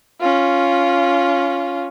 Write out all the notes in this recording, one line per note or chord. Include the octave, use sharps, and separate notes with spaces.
C#4 F4